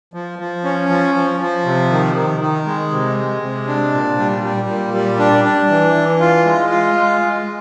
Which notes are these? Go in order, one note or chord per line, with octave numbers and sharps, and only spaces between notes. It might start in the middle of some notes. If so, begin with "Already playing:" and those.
F3
F3
C#4
F3
F3
F3
C3
D#3
D#3
D#3
G#3
C3
G#3
C3
D4
A#2
G3
G3
A#2
G3
D4
D4
E3
E3
F4
G#3
F4
G#3
G#3